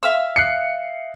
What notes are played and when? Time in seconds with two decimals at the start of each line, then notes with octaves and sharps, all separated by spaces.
0.03 E5 F5 E6
0.36 F#6 C7 C#7